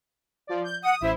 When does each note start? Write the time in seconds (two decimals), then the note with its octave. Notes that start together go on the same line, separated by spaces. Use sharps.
0.47 F3 D5
0.64 G6
0.83 F#5 D#6
1.01 A1 E4 C5 E5